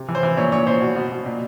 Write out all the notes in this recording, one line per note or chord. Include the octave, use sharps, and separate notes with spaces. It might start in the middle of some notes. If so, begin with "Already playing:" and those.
Already playing: C3
E3
C5
E3
A#2 C#5
A#2 C#5
A#2 C5
B2
B2
B2
A#2